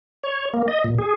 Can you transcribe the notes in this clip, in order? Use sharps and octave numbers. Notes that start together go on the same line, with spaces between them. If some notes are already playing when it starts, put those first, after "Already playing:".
C#5
A#3
D#5
A#2
G#4